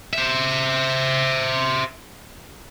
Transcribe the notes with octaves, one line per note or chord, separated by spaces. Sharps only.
C5 E5